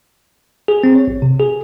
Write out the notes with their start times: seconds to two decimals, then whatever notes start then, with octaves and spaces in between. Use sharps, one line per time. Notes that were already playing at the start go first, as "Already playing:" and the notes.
0.68 G#4
0.84 C4
0.95 C#5
1.07 A1
1.22 C3
1.40 G#4